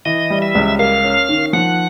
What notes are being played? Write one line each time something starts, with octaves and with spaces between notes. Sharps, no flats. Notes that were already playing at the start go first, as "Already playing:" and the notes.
E3 D#5
G3
E5
C#2
A#3 F5
C#4
D#3
F3 F#5